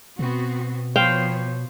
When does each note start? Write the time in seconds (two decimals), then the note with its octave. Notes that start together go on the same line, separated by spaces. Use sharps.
0.19 B2 B3 C4 F#4
0.96 F3 B3 C5 C#5 F5 G5